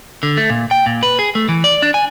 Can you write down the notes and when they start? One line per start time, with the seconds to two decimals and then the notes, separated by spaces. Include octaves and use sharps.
0.23 D3
0.37 A3
0.50 A#2
0.71 G5
0.86 A#2
1.03 B4
1.19 G#4
1.35 A3
1.49 E3
1.64 D5
1.82 D4
1.94 G#5